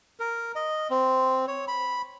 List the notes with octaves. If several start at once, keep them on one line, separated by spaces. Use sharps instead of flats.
A#4
D#5
C4
C#5
B5